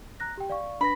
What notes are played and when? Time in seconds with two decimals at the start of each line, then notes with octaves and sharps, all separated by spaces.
0.20 A#5 F#6 A#6
0.38 G4 G5
0.50 D5 F5 C#6
0.81 D4 B4 B5 A#6